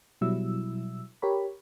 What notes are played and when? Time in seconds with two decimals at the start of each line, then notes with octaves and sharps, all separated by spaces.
0.21 B2 F#3 G3 E4 E6
1.22 G4 A#4 C#5 B5